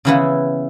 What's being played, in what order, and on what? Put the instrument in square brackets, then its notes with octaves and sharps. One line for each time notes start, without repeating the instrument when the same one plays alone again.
[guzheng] C#3 E3 B3 E4 B4